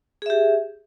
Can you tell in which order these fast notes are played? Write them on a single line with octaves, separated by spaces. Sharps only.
G#4 E5 G4